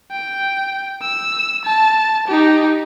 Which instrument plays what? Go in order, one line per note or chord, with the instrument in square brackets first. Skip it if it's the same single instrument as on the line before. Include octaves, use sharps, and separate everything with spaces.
[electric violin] G5
E6
A5
D#4 G4